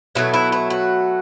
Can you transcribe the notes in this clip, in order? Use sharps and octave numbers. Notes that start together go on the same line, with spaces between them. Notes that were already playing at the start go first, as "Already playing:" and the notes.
B2 F#3 A3 E4
E4
E4
F#4